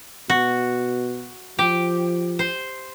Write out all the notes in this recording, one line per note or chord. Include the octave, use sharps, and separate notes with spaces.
B2 F#4
F3 G4
C5